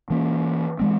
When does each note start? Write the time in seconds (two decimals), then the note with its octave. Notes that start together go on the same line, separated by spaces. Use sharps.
0.10 E3 A#3 C#4
0.79 E3 G#3 C4